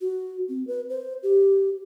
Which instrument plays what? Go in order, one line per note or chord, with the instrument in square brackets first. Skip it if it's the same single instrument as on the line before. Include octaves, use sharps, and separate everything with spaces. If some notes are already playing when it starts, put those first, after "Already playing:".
[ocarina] F#4
C4
B4
C5
G4